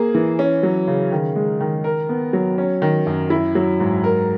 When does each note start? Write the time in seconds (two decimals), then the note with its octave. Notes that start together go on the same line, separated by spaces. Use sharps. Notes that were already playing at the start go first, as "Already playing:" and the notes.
Already playing: A#3 G#4
0.15 E3
0.39 C#4
0.63 F#3
0.88 C#3
1.12 D#3
1.36 G#3
1.61 D#3
1.84 A#4
2.09 B3
2.33 F#3
2.58 C#4
2.82 D#3
3.07 F#2
3.30 E4
3.55 F#3
3.80 G#2
4.04 A#4